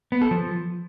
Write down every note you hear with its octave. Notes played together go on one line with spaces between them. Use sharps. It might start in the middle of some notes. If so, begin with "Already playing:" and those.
B3
A4
F3